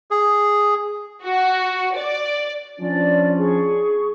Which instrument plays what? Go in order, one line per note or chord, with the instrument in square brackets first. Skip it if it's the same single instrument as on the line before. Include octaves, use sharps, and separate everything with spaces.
[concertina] G#4
[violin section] F#4
D5
[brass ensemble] F3 C#4 D4 [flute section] D5
[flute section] G#4 C#6